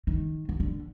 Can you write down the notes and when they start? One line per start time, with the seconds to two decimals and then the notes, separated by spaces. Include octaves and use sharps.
0.07 D#3
0.49 D#3
0.60 D3